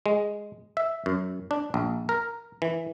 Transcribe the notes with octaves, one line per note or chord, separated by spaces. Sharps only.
G#3
E5
F#2
D4
A#1
A#4
E3